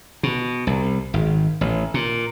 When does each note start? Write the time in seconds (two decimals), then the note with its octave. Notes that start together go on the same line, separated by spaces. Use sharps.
0.23 B2
0.67 C2
1.14 G#1
1.61 A1
1.94 A#2